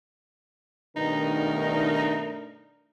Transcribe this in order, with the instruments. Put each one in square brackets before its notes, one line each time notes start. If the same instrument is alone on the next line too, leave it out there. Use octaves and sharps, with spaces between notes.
[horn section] G2 B2 D#3 [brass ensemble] A3 D4 A#4 [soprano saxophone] D#4